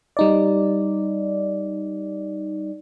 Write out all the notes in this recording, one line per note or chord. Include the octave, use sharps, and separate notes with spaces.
G3 D#4 D5